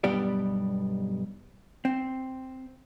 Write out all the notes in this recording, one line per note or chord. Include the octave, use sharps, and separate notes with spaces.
B1 G2 G3 B3 G4 D5
C4